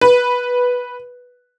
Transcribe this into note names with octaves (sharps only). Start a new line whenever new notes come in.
B4